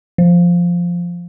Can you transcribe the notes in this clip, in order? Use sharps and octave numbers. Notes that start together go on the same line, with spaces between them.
F3